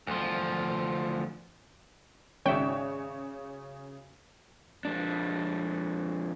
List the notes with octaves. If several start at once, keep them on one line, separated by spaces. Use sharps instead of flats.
D2 F3
G#1 C#3 C#4 F#4 C#5 D5 E5 G5
F2 D4